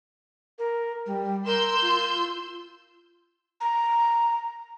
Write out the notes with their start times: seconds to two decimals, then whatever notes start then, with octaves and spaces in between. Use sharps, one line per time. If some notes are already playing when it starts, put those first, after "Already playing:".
0.59 A#4
1.06 G3
1.46 A#4 C6 E6 G6
1.82 F4
3.61 A#5